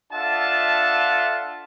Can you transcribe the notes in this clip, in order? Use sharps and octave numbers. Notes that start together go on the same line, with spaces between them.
D4 F4 A4 E5 F#5 A5